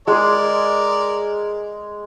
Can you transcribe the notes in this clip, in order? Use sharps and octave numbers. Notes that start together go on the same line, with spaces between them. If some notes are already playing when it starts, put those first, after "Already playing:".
G#3 G#4 A#4 D5